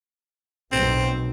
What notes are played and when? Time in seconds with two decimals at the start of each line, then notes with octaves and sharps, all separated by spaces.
0.72 B1 C4